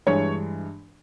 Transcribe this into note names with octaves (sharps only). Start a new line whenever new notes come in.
G2 E3 G#3 C#5